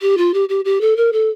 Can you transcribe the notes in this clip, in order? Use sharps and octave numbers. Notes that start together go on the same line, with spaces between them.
G4
F4
G4
G4
G4
A4
A#4
A4